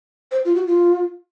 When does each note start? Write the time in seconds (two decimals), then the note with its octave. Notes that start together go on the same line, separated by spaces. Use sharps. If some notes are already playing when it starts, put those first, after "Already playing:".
0.31 C5
0.45 F4
0.55 F#4
0.66 F4